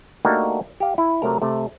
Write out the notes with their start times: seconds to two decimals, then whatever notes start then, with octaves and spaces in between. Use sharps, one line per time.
0.25 A3 A#3 D4 D#4 F#4 G4
0.80 G4 F5
0.98 E4
1.22 C3 F#3 A3 A#4 A#5
1.42 C3 A3